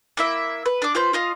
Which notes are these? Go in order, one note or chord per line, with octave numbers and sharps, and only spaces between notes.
A#3 E4 E5
B4
D4 D6
F4 B4 C5 G6
F4 D#5 F5